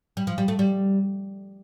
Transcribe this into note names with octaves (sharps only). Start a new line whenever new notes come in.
G3
F3
G3
A3
G3